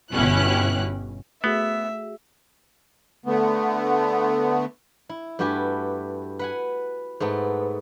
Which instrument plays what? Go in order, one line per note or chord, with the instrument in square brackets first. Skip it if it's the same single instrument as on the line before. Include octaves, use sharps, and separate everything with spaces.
[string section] G1 B2 C#4 E4 G4 F#6
[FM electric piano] A3 F#4 G#4 [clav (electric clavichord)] B3 [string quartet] E5
[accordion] D3 A3 B3
[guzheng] E4
G2 A3 F#4 G4 B4 G#5
B4 F#5 G#5
G#2 A3 B3